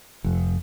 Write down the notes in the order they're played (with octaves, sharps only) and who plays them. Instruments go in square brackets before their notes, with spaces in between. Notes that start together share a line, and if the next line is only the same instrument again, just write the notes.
[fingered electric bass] F1